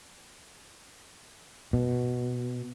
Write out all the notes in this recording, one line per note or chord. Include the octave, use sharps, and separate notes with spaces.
B2